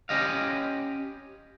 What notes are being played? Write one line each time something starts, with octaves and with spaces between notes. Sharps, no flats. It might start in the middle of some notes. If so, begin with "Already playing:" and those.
C#4 G4 D#5 F5